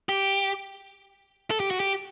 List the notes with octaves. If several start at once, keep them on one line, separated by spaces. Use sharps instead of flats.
G4
A4
G4
F#4
G4